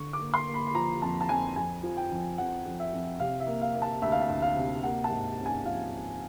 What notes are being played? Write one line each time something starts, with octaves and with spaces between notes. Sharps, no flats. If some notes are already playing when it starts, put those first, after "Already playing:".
Already playing: D3 C#6
D6
A#3
C6
A#3
B5
B5
F3 A#5
F2 A5
A5
F2 G#5
F2 G#5
F3
G5
F2
F2 F#5
F2
E5
F2
C3 F5
E5
A#3
F5
A#3
A5
D2 E5
F5
E5
D2
F5
C3
A#3 F#5
A5
G#2
C#4
G#5
F3 F5